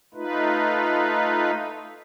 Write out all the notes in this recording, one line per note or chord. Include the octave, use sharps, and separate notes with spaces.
A3 D#4 F4 B4